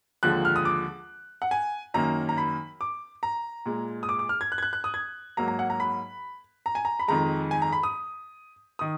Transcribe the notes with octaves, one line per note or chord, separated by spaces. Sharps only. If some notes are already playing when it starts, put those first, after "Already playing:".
D#2 D3 F3 G#3 F#6
F6
D#6
D6
F#5
G#5
F#2 D#3 A#3 A#5
A#5
B5
D6
A#5
A#2 G#3
D#6
D6
D6
F6
G#6
F#6
G#6
F#6
F#6
D#6
G#6
G#2 F#3 A#3 A#5
A#5
F#5
A#5
B5
A#5
G#5
A#5
B5
F2 D#3 G#3 A#5
G#5
A#5
B5
D#6
D#3 D#6